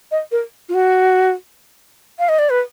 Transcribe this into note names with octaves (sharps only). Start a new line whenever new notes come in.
D#5
A#4
F4
F#4
F5
D#5
D5
B4